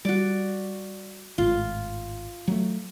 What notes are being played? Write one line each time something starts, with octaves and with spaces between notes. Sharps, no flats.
G3 F#4 D5
G#1 A2 F4
F#3 G3 A3